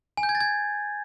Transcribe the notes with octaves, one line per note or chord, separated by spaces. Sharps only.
G#5
G6
G#6
A6
G#6